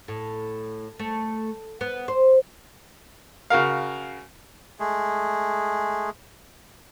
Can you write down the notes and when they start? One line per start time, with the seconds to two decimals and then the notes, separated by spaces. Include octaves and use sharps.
0.08 A2
0.99 A3
1.81 B3
2.08 C5
3.50 C#3 F#4 A#4 F5
4.80 G#3 A3 G#4